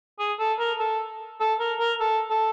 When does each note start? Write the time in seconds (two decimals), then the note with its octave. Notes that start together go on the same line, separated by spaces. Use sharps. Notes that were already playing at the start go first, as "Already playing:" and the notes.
0.19 G#4
0.39 A4
0.59 A#4
0.79 A4
1.40 A4
1.60 A#4
1.80 A#4
2.00 A4
2.30 A4